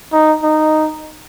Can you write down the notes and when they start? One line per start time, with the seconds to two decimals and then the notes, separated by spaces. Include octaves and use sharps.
0.12 D#4
0.43 D#4